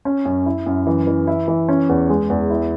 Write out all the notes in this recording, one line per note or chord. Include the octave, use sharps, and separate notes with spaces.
C#4
F#2
E4
F#2
E3
E3
E4
E3
C#4
E2
G#3
E2
E4